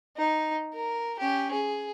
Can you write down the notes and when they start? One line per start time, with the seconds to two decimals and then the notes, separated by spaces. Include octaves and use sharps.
0.17 D#4
0.74 A#4
1.19 C#4 G4
1.52 G#4